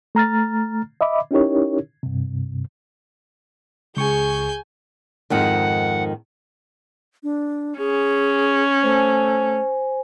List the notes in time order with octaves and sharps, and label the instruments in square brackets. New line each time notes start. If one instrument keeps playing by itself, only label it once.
[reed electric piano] A3 A#5 F6 A6
D#5 E5 B5 D6
C#4 D#4 E4 G4 A#4 C#5
G2 C3
[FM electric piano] C#2 C#6 [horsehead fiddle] G#4 [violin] G#5 G6
[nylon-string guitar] F2 G#2 D#3 [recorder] F#5
[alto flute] D4
[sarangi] C#4 [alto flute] G#4
[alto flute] A3 [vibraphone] C5 G#5